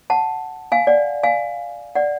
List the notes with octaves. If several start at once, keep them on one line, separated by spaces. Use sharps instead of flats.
F#5 A5
F5 G#5
D5 F#5
F5 G#5
D5 F#5